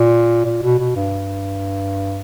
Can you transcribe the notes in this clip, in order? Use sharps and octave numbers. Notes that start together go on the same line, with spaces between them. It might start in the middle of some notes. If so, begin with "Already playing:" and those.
Already playing: A#2
A#2
B2
B2
G2